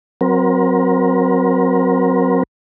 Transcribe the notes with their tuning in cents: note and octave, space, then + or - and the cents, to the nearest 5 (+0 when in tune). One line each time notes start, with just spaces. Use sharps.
F#3 +0 C4 +0 A#4 +30